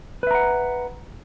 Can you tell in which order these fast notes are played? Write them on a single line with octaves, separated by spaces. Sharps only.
B4 E5 A#5 F#5